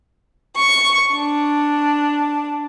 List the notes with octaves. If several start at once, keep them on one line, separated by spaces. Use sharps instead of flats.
C#6
D4